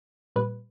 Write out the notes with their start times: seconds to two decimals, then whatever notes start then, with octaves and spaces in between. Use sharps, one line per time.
0.36 A#2 G3 B4